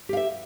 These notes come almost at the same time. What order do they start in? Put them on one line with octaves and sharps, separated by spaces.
G4 F5 E5